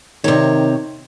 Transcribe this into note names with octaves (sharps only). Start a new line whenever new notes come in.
C3 D#3 C#5